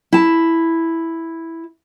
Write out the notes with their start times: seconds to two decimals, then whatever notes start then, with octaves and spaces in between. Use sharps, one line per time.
0.13 E4 A5